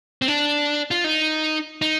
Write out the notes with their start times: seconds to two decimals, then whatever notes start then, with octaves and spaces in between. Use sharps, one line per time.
0.22 C4
0.28 D4
0.91 F4
1.04 D#4
1.82 D#4